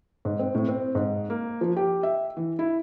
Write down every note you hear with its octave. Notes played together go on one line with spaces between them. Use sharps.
G#2
C4
A2
C4
G#2
A#3
F3
G4
E5
E3
E4